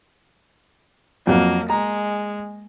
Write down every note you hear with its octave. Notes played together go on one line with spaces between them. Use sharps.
F2 F#3 A#3 F#4
G#3 A#5